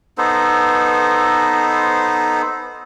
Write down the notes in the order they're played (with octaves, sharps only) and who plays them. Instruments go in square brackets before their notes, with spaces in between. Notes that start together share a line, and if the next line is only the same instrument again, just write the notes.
[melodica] B3 D#4 A4 C5